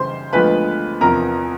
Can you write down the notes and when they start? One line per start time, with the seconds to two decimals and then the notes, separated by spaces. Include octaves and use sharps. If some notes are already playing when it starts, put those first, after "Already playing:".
Already playing: F#2 C#3 E3 G3 C5 C6
0.33 D2 D3 F3 G#3 B3 B4 B5
1.01 E2 C3 F3 A#4 A#5